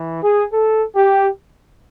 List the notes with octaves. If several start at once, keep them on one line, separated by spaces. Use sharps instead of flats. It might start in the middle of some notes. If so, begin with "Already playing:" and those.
Already playing: E3
G#4
A4
G4